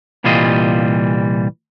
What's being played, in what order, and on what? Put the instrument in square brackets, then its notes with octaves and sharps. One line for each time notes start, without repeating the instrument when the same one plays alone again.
[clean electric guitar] C2 A#2 E3 G3 F4 D#5